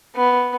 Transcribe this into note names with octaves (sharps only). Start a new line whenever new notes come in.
B3